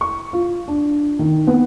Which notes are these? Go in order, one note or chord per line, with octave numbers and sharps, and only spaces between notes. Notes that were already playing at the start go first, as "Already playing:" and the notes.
C#6
F4
D4
D#3
B3